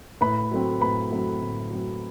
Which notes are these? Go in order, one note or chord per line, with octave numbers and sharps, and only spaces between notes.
A2 B4 B5
F#3 A3 C4
A2 B4 B5
F#3 A3 C4
A2
F#3 A3 C4